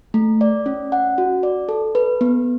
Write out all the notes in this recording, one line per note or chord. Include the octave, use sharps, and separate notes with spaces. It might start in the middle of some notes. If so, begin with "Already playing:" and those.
A3
D5
C#4
F#5
F#4
D5
A4
B4
B3